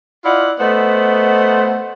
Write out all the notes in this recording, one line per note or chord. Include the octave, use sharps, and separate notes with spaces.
E4 F4 D5 D#5 F#5
A3 B3 C5 D#5 F#5